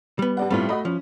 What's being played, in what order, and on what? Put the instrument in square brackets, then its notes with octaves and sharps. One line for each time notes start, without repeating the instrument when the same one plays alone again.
[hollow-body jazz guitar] G3 B3
[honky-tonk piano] G2 D5 F#5
[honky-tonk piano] A2 C4 [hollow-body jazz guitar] G3 B3 F4
[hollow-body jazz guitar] A3 [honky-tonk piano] F#4 D#5 B5
[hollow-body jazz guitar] F3 [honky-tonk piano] C#4